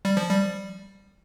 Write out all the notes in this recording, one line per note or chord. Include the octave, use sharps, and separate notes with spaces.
G3
F3
G3